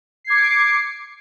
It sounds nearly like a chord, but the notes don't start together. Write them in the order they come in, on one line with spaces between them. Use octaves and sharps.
C7 G#6 D6 C#7